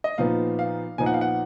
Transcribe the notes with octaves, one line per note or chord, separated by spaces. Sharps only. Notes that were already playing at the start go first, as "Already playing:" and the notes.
D#5
A#2 F3 B3 D#4 F5
F5
A#2 F3 B3 D#4 G#5
F#5
F5
F#5